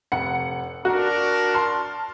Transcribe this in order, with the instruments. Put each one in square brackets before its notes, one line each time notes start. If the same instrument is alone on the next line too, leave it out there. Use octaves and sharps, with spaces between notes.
[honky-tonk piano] F1 F#5 C#7
[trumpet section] D4 A#4 [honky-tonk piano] F#4
[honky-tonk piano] A5 C6 F6